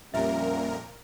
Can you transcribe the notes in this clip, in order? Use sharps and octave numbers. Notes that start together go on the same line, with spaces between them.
F2 A#2 G3 A#3 C#4 A#4 E5